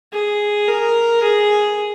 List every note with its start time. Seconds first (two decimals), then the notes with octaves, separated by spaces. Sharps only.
0.13 G#4
0.68 A#4
1.22 G#4